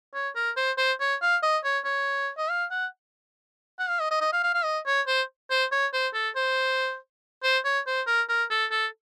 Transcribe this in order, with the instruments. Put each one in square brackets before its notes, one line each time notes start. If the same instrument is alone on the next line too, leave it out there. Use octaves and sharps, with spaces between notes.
[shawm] C#5
A#4
C5
C5
C#5
F5
D#5
C#5
C#5
D#5
F5
F#5
F#5
F5
D#5
D#5
D#5
F5
F5
F5
D#5
C#5
C5
C5
C#5
C5
A4
C5
C5
C#5
C5
A#4
A#4
A4
A4